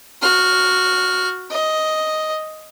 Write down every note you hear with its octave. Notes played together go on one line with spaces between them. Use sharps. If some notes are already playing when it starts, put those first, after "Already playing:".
F#4 F6
D#5